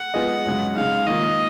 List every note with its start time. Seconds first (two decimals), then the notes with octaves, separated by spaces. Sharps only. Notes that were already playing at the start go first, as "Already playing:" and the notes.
Already playing: F#5
0.14 G#3 B3 F4 G#4 D#5
0.45 F#2 C#3 G#3
0.76 C#3 G#3 D#4 F5
1.07 D#3 A#3 F4 D#5